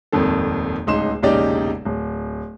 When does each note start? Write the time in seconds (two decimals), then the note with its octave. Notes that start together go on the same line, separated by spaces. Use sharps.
0.12 D#1 G#1 F2 D#3 A4
0.87 D1 C#2 D#4 C6 E7
1.22 E1 A#1 C#3 D#4 G4 D5
1.85 D1